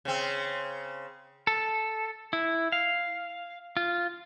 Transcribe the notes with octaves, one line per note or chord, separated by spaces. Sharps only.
C#3 C4
A4
E4
F5
F4